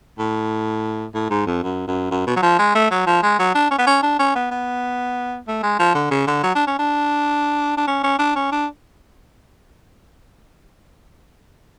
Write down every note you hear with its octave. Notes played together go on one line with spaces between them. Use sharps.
A2
A2
G#2
F2
F#2
F#2
F#2
B2
F#3
F3
G#3
A3
F#3
F3
G#3
F#3
D4
C#4
B3
C#4
D4
C#4
B3
B3
A3
G#3
F3
D3
C#3
D3
F#3
D4
C#4
D4
D4
C#4
C#4
D4
C#4
D4